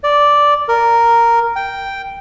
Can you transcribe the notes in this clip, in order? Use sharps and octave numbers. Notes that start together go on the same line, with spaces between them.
D5
A#4
G5